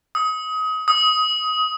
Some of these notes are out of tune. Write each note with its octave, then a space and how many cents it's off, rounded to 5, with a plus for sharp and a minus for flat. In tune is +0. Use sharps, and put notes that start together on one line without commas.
D#6 +25
D#6 +15